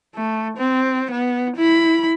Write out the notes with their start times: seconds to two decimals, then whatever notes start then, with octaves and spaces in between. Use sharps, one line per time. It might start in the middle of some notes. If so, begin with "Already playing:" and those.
0.15 A3
0.57 C4
1.11 B3
1.57 E4 B5